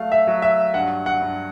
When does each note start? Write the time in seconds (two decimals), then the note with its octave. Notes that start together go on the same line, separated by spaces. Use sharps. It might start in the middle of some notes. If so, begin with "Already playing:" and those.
Already playing: F#3 A3 F5
0.12 E5
0.27 F#3
0.42 E5
0.74 G2 F#5
1.06 F#5
1.22 G2